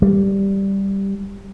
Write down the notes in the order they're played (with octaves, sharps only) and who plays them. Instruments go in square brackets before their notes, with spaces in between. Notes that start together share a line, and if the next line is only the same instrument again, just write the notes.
[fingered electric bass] G3